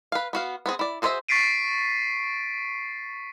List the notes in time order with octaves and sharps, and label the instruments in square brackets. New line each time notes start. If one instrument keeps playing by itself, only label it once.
[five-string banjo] B4 F5
B3 F#4 F5
B3 C4 G#4
E4 D5
F#4 G#4 C5 D5 E5
[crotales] C#6 A6 B6 C7 D7 D#7